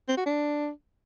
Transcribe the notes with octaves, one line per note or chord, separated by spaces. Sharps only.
C4
F#4
D4